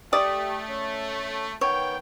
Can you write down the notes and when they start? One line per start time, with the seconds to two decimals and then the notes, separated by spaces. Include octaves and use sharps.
0.13 A3 G4 D5 D#6
0.69 C#4
1.61 D#3 B3 C#5 G5